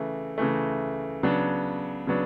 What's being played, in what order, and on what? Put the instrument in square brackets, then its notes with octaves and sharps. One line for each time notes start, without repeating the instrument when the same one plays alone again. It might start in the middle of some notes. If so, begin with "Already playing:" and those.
Already playing: [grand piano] C#3 E3 A3
C#3 E3 A3
C#3 F#3 B3 D4
C#3 F#3 B3 D4